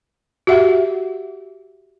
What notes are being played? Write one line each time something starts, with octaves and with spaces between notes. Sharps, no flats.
F#4 G4 E5 F#5